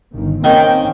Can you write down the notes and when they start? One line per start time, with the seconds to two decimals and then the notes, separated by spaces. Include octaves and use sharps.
0.14 G1 D#3
0.44 D#3 A#3 C4 C#4 G5